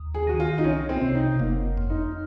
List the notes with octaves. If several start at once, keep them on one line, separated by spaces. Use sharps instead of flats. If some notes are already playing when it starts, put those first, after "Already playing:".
Already playing: D#2
G#4
D#3 F#4
F4
D#4
C2 C#4
C4
C3
D#4
F#1 A#3
F2
D#4